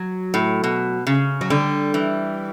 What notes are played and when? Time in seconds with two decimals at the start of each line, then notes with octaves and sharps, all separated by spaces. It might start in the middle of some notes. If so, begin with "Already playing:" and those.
Already playing: F#3
0.34 A2
0.64 B2
1.07 C#3
1.41 F#3
1.50 D3 G3
1.94 E3